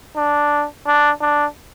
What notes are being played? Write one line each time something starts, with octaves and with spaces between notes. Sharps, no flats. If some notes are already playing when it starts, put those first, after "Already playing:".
D4
D4
D4